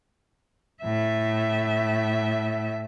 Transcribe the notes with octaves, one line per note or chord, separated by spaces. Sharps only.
A2 E5